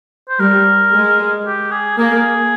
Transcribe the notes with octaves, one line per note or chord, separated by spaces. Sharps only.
C5
G3 A#4
G#3
G4
G#4
A#3 G#4